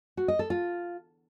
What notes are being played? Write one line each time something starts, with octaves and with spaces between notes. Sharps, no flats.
F#4
D#5
A4
F4